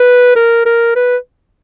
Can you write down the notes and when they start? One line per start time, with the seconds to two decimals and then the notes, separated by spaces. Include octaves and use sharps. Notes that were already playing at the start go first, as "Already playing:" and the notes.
Already playing: B4
0.36 A#4
0.66 A#4
0.96 B4